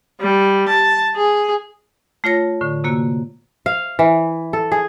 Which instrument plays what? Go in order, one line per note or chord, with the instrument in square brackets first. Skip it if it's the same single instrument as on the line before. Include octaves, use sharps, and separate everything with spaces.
[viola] G3
A5
G#4
[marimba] A3 F4 C#5 A#6
A2 D3
C3 A#3 F#4
[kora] F5
E3
A4
G#4